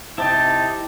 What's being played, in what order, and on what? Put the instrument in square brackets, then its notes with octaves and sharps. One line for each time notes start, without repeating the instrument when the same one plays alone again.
[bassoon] C3 [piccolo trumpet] D#4 [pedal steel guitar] E4 G4 G5 [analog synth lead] A5